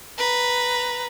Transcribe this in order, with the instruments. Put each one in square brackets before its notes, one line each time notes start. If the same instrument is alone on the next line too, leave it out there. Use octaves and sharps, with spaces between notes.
[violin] B4 A#5